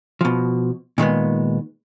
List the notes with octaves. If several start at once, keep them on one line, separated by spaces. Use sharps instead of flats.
B2 F3
A#2 D#3 G#3 B3